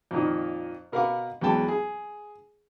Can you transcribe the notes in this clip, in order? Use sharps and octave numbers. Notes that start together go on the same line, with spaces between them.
F2 A#2 D#3
B2 A#4 B4 F5 F#5 D6
E2 F#3 G#3 B3 G5 A5
G#4